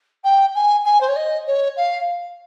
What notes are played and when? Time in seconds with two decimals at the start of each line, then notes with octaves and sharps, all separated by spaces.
0.24 G5
0.55 G#5
0.85 G#5
1.00 C5
1.08 C#5
1.16 D#5
1.47 C#5
1.76 F5